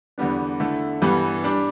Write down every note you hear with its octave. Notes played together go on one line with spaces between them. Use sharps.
E2 D3 G3 B3 D4
D3 A3 E4
G2 E3 G3 B3
G3 D4